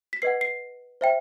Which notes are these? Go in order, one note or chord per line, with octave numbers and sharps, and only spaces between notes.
B6
B4 D#5 F#5 C7
C7
C5 E5 G5